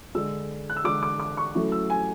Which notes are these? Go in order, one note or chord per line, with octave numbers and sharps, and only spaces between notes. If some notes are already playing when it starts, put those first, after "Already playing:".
D3 G#3 D4 E6
F#6
E6
D3 G#3 D4 D6
D6
D6
C#6
F#3 A3 C#4 E4
E6
G#5